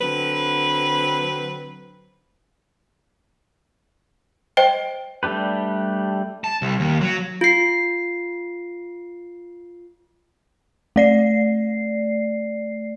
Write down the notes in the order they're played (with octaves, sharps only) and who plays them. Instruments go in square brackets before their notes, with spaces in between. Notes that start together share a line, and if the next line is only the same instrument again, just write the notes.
[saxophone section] D3 F#3 C4 B4
[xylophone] C5 D#5 G5 D7
[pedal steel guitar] G3 A3 D4 G4 B4
[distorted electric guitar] A5
C2
D#2
F#3
[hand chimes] F4 C7
[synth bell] A3 D5 C7